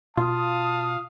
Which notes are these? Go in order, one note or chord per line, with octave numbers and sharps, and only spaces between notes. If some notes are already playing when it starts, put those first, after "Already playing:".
B2 F4 F5 A5 D#6